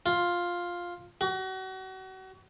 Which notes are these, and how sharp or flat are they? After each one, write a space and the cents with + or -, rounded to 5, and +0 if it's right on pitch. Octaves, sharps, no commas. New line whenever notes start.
F4 +5
F#4 +35